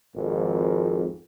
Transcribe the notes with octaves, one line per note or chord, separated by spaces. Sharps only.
G#1 F2